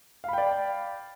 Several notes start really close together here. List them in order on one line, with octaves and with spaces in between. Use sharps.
F5 B5 G5 D5